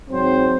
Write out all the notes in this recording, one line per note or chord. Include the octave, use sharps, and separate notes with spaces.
G#2 F#3 C4 C5